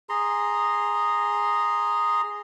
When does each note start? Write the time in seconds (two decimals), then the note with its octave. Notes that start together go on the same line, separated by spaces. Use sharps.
0.09 G#4 A#5 C6